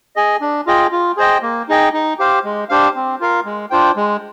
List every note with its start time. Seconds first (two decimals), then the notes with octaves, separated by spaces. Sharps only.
0.16 G#4 D#5 G#5
0.41 D4
0.67 F4 G#4 D#5 G5
0.92 F4
1.17 G#4 C5 D#5 G5
1.42 A#3
1.69 D#4 G#4 D#5 G5
1.93 D#4
2.19 G4 C5 F5
2.44 G#3
2.69 D4 G4 C5 F5
2.95 C4
3.20 F4 A#4 F5
3.45 G#3
3.70 D4 F4 C5 G5
3.97 G#3